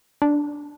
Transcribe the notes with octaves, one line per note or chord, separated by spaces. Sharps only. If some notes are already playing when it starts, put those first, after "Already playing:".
D4